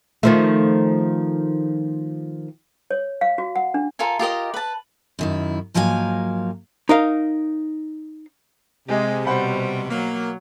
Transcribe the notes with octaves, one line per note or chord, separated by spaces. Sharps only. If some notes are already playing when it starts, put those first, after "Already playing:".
D#3 F3 A3
C#5
F5
F#4
F#5
D4
F4 A4 A#4 G#5
F4 G4 A#4 D#5
B4 A5
F#2 D#3 E4
G#2 F3 F#3 A#3 F5 G#5
D#4 A#4 F5
C3 G#3 G4 G#4 D#5
B2 G3 C5 F#5 B5
F#3 A#3